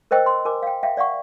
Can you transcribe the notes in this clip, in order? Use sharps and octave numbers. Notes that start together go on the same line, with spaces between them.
A#4 C5 D#5 G5 E6
C6
A#4 G#5 D6
F5 G5
E5 F5 G5
D5 F5 F#5 C#6